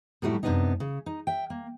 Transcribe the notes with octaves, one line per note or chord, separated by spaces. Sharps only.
A2 F#3 G3 A3 E4
F#2 C3 G3 B3 D4 D#4
C#3
D#4
E5 G5
A#3